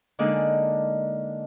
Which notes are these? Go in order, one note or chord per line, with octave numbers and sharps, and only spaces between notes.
D3 G#3 A#3 D4 D#4